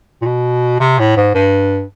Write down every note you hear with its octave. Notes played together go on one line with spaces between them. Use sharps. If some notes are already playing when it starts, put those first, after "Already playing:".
A#2
B2
C3
A2
G#2
G2